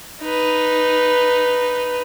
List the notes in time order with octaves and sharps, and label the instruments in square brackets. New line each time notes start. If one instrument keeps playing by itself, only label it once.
[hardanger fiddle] D#4 B4